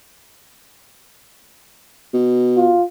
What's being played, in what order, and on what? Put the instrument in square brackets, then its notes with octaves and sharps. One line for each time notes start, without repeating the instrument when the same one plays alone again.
[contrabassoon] B2
[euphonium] F4